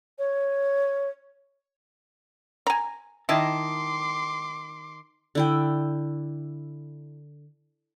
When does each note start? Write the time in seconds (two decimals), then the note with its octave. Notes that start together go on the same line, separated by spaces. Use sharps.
0.18 C#5
2.67 G#5 A#5
3.29 D#3 E4 D#5 A5 C6 D6
5.35 D3 E4 G5